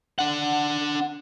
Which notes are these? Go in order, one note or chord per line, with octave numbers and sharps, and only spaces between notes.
D4 F#5